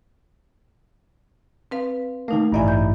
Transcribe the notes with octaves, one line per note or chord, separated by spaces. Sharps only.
C4 B4 F5
D#3 A3 A#3 D#4
A1 G2 D#4 E4 D5 G#5
G6